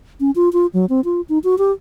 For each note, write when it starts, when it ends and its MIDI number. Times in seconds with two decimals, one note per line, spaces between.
0.20 0.31 61
0.36 0.49 65
0.53 0.67 65
0.74 0.86 54
0.89 1.01 60
1.05 1.21 65
1.29 1.39 63
1.44 1.58 66
1.58 1.71 67